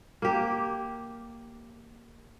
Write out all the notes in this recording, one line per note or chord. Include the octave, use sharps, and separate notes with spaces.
A#3 G4